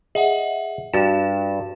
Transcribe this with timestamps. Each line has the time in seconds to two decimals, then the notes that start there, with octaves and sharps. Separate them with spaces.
0.15 G#4 D#5 E5 F#5
0.93 G2 F#4 A6 E7